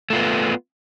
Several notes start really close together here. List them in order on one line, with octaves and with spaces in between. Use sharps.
A3 F4 B3